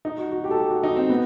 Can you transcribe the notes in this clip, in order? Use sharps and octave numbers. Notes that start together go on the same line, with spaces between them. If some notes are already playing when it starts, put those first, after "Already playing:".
D#4
F#4
F#4
G4
A4
G4
F#4
D#4
C4
B3